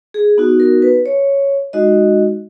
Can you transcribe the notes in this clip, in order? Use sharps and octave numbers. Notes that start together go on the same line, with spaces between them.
G#4
B3 D#4 F#4
A#4
B4
C#5
G#3 D#4 F#4 D#5